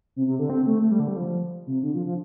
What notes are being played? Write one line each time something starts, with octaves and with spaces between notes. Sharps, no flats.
C3
C3
D3
C4
A3
A3
G3
D3
G3
F3
C3
D3
F3
F3